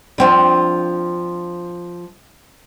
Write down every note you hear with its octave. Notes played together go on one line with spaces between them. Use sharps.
F3 C4 D4